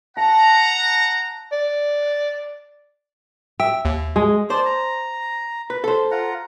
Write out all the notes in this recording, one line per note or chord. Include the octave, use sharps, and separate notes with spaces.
F#5 A5 A#5
D5
E5 G5
D#2
G#3
C5 D5 A5
A#5
B4
A4 C5
F4 F#5 A#5